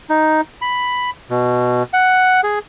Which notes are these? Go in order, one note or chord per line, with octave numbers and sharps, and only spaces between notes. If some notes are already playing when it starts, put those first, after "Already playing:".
D#4
B5
B2
F#5
G#4